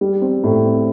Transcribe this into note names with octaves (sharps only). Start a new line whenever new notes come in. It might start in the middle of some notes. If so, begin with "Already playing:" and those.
G3
C4
A2
C4